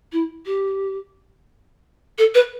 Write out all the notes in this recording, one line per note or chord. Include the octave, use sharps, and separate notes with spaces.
E4
G4
A4
B4